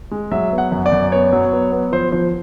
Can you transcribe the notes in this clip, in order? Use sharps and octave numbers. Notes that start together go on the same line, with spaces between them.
G#3
F#3 E5
B3
F#5
F#2
D5
F#2
B3 C#5
F#3
B3
B3
F3 C5
F3 C5